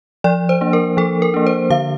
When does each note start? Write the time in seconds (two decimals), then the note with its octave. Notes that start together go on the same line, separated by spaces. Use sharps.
0.24 F3 D5
0.49 C5
0.61 A#3 D4
0.73 A#4
0.97 F3 A4
1.22 A#4
1.34 A#3 D4
1.46 C5
1.70 D3 F5